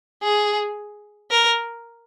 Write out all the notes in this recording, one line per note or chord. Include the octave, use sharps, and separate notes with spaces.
G#4
A#4